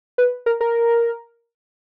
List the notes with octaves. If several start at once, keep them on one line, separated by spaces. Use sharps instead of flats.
B4
A#4
A#4